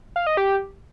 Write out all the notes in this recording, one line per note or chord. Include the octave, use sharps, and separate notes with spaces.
F5
D#5
G4